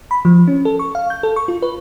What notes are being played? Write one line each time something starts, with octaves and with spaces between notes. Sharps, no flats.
B5
F3
C#4
A4
C#6
F5
G6
A4
C#6
F4
B4